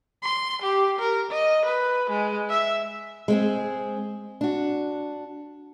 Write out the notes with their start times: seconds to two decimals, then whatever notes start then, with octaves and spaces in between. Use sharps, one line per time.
0.23 C6
0.62 G4
0.99 A#4
1.31 D#5
1.65 B4
2.10 G#3
2.50 E5
3.28 G#3 C4 G#4
4.41 D4 F#4